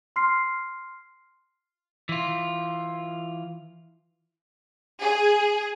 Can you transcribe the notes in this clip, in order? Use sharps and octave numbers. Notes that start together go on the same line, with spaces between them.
C6 F6 C7
E3 F4
G#4